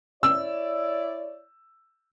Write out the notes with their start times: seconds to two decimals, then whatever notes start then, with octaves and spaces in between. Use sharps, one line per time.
0.23 E4 C#5 D5 E6